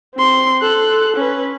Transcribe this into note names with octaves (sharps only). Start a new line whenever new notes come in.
C4 C6
A4 F#6
C#4 B4